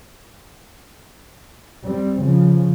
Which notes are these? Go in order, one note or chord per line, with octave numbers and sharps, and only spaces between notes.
G3 C4
C#3 F3